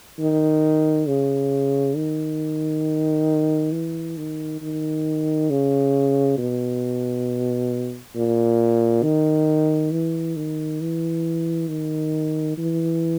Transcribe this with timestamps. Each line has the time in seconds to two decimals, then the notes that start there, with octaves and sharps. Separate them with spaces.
0.19 D#3
1.07 C#3
1.96 D#3
3.73 E3
4.17 D#3
4.61 D#3
5.50 C#3
6.38 B2
8.15 A#2
9.03 D#3
9.92 E3
10.36 D#3
10.81 E3
11.68 D#3
12.58 E3